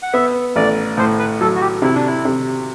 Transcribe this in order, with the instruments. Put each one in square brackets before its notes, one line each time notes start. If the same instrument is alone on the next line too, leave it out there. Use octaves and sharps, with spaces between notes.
[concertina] F#5
[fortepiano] B3 [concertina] E5
[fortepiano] A1 [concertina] D5
[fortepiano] A2 [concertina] C5
[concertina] B4
[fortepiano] F#3 [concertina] A4
[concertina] F#4
G4
[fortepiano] C3 [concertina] E4
[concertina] D4
E4
[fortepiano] C3